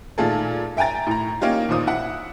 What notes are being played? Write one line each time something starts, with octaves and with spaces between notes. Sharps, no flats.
A#2 D#3 A3 F4 G#4 A4
E5 G5 G#5 A#5 A6
A2 A#5
A#3 C#4 D#4 F4 G4
D#2 A#2 C5 D#6
E4 F#5